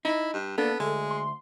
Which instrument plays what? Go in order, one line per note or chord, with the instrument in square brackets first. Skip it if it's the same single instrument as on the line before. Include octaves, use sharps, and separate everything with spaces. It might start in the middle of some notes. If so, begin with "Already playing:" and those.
[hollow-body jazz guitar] D#4 [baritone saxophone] E4
[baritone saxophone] G2
[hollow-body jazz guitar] A#3 D4 [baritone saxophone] B3 [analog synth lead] A4
[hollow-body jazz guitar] D2 [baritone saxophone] G#3
[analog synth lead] C6